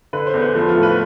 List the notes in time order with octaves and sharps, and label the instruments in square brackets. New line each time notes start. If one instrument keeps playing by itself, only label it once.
[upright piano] D3 B4
C5
E2
B4
F3 A4
F4
A2
B4